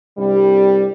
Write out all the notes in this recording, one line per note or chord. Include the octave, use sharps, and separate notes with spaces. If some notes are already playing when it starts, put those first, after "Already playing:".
C2 G2 G3